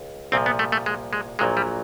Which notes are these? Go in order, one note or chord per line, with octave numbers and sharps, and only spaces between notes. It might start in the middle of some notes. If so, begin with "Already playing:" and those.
Already playing: C#2
C2 A#2 F3 C4
B3
A3
A3
G#3
G#3
A#1 A#2 F#3 G#3
G3